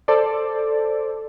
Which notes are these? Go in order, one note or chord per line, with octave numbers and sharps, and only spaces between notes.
A4 C5 D5